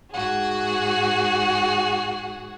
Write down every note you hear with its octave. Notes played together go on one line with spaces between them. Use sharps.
G#2 F#4 G#4